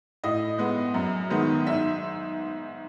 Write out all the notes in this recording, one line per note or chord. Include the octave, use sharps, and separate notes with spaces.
A2 D#5
G#3 B3
F#2
D#3 G#3 B3
G#2 E5